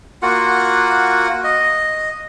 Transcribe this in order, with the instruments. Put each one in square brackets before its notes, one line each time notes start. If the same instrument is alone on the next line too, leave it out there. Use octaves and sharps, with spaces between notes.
[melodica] A#3 F4 F#4 F#5
D#5